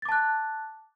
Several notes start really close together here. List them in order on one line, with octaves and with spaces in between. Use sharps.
A6 D6 A5 F#6